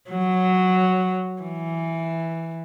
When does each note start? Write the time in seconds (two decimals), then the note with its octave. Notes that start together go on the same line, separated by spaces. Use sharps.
0.10 F#3
1.42 E3